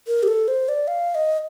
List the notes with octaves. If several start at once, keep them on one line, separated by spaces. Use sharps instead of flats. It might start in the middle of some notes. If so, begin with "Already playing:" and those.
A#4
G4
A4
C5
D5
F5
D#5